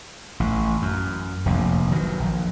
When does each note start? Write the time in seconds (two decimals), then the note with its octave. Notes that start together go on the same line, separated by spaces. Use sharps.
0.40 A1
0.82 F#2
1.46 F1 A#1
1.91 D#3 F#3
2.20 A#1